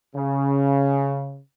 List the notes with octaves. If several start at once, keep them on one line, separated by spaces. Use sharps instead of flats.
C#3